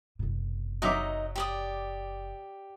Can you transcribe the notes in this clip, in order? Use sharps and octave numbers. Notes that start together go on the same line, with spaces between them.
F#1 C3
F#3 D#4 D#5 E5 D6
G4 D5 D#6